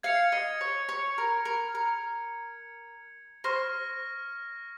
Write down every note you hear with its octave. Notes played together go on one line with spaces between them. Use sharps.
F5 G#6 C#7 F7
D#5
C#5
C#5
A#4
A#4
A#4
C5 C#6 F6 A#6